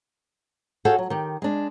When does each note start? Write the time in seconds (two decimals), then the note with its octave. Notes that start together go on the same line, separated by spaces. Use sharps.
0.85 F#4 G#4 A4 C#5 F5 G5
0.99 F#3
1.10 D#3 G4
1.42 G#3 D4